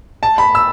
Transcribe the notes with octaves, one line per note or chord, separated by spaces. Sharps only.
A5
B5
E6